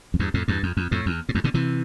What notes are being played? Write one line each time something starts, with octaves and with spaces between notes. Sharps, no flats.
F2
E2 G2
F2 A2
E2 G2
F2
F2
F2 A2
E2
A2
E2 G2
B2 D3
C3 E3